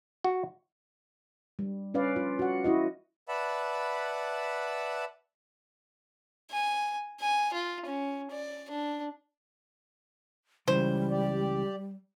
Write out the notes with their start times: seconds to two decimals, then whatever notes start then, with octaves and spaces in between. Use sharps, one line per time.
0.24 F#4
1.59 G3
1.94 C#4 B4 D5 F5
2.16 F4
2.39 F#4 F#5
2.64 E4 F#4 D#5
3.28 B4 D5 E5 F#5 A5 B5
6.51 G#5
7.20 G#5
7.53 F4
7.86 C#4
8.31 D5
8.71 D4
10.68 C#2 C#3 E3 G3 C5
11.10 G4 D5